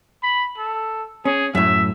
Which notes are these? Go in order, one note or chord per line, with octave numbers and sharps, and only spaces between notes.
B5
A4
C#4 G#4
F#2 A2 E5